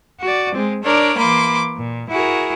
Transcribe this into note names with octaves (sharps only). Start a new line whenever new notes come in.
F#4 D5
G#3 C4
D4 A#4 C#5 D5
E3 A#3 B5 C6 D6
A#2
E4 F#4 G#4 A#4